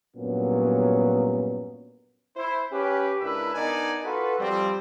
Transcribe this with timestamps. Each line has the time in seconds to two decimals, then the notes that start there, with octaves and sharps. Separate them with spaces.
0.17 G2 A#2 F#3 B3 C#4
2.36 E4 C5
2.72 C#4 G4 B4
3.21 C#2 D4 E4 A#4 B4 E5
3.54 B3 D4 D#4 A#4 D5 G#5
4.04 F4 F#4 A4 B4
4.39 F3 G3 C4